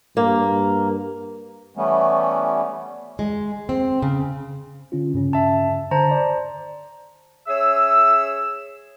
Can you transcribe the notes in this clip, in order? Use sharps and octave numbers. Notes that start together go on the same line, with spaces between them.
G2 A#3
E3 G3 A3 B3 C#4
G#3
C4
C#3
D3 C#4 F4
G2 C#3 C#4
E5 A5
D3 C5 A5 A#5
D5
C#4 G#4 C#5 E5 E6